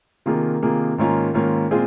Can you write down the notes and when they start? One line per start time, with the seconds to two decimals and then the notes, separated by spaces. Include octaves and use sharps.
0.26 C3 D#3 A#3 F4 G#4
0.62 C3 D#3 A#3 F4 G#4
0.98 G#2 D#3 A#3 C#4 F4
1.34 G#2 D#3 A#3 C#4 F4
1.71 A#2 G#3 C4 F4 G#4